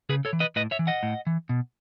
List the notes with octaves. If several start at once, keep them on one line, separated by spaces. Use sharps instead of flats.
C#3 G#4 B4
A4 C#5
E3
B4 D#5
A2 B4 D#5
C#5 E5
E3
D#5 F#5
A2
E3
B2